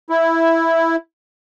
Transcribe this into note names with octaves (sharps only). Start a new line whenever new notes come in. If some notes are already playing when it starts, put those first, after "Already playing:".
E4